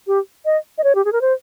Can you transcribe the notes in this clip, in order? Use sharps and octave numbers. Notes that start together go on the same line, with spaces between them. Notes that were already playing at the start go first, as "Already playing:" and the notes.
G4
D#5
D#5
C#5
G4
G#4
A#4
C5